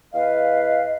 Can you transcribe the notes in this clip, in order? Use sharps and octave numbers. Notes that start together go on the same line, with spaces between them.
E2 B4 D#5 F5